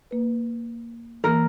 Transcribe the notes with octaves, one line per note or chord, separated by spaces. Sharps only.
A#3 B4
E3 A#3 A#4